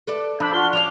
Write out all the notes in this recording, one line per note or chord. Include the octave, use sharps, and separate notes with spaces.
A4 B4 D5
F3 D4 C5 B5 E6
F4 F#4 F6 G7
F3 C#4 F5 D6 F7